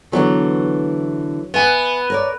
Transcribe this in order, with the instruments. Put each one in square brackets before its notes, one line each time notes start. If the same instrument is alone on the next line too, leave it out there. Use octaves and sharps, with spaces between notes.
[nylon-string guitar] D3 E3 B3 [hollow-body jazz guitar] F#3
[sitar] B3 [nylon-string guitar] E5 G#5
[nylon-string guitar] A#4 C#5 D5